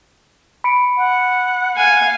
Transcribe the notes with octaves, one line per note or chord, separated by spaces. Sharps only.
B5 C#7 D7
F#5
F5 G#5